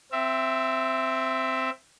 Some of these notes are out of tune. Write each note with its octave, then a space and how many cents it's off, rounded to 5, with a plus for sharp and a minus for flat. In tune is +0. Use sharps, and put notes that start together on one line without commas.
C4 -5 E5 +10